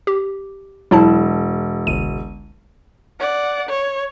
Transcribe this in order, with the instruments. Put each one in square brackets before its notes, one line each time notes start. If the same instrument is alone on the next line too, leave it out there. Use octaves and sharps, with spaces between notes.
[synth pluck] G4
[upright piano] E1 [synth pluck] F#3 E4 A5
[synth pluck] G1 C#2 D#7
[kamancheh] D5 F#5
C#5